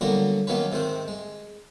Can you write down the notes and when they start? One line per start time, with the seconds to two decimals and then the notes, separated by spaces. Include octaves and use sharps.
0.01 D3 F#3 G3 A#3 B3 F#4
0.47 D#3 F#3 A#3 B3 C#4 B4
0.72 G#2 C3 D#3 C4
1.08 G#3